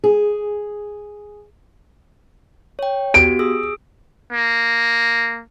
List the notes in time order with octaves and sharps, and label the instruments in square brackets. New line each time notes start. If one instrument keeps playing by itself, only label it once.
[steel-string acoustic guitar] G#4
[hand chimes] C#5 G5
[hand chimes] B3 F#4 G4 [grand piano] D7
[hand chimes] G#4 D#6 E6
[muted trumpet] A#3